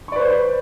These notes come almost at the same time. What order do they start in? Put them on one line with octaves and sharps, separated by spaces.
C#6 D5 B4 C5